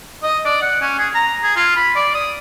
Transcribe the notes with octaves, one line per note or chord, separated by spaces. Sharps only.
D#5
D5
F#5
C#4
G#4
A#5
G#4
F4
B5
D5
D#6